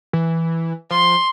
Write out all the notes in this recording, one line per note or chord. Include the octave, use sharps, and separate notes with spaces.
E3
F3 C6